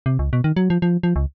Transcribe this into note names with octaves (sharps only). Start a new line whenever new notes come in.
C3
C#2
B2
D#3
F#3
F3
F3
F3
C#2